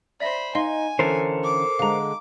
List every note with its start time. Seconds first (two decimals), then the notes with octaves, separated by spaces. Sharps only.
0.20 C5 D5 E5 B5 A#6
0.55 D#4 D#5 F5 G#5 C6
0.99 D3 E3 C#4 A4 A#4 C5
1.44 D6
1.79 D3 G#3 F5 A#5